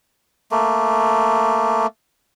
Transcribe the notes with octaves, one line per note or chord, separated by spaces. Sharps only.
A3 A#3